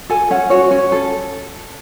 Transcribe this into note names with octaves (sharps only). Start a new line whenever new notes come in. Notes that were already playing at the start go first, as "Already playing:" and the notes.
A4 G#5
C#4 F#5
F#4 C#5
C#4
A4